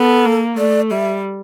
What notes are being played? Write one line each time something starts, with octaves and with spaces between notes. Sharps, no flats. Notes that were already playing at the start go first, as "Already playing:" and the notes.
Already playing: B3 A4
A#3
A3 D5
G3 E5